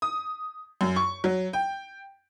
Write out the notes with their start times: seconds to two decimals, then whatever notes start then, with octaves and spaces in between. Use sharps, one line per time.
0.02 D#6
0.81 F#2
0.96 C#6
1.24 F#3
1.53 G5